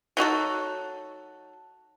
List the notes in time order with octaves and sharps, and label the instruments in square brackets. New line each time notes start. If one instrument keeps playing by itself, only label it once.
[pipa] F#3 D#4 F#4 A4